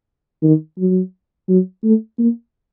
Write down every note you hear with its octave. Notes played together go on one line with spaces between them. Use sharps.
D#3
F#3
F#3
A3
A#3